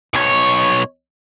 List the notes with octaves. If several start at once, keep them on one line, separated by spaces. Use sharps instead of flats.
B1 C#5